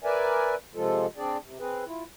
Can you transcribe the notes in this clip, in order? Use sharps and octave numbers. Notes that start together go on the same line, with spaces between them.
A#4 B4 D5 E5 G#5
C3 F3 G#3 F4 A4
C4 D4 G#4 D5
C3
C4 G#4 B4
E4 F4